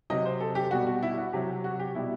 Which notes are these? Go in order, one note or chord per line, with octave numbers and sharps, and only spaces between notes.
C3 F#3 D#5
C5
A4
G4
B2 G3 F#4
F#4
E4
F#4
C3 F#3 G4
F#4
G4
B2 G3 E4